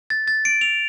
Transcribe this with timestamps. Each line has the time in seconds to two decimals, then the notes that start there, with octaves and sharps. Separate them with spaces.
0.10 A6
0.28 A6
0.45 D7
0.61 F7